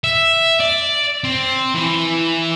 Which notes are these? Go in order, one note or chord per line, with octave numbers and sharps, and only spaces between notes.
E5
D5
C4
E3